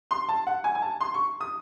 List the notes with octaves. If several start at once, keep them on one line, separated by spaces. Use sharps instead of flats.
C6
A5
F#5
G#5
G#5
A5
C6
C#6
D#6